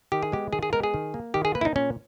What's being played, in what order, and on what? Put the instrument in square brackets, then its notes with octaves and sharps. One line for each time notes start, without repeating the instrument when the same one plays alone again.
[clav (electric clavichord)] D#3 G4
G#4
G#3 B3 G4
D#3 G#4
G#4
G#3 B3 A#4
G#4
D#3
A#3
D#3 G4
G#4
A#3 B4
E4
D#4
A#2 C#4